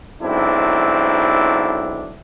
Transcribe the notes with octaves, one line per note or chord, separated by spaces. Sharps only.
B1 G#2 C4 D4 E4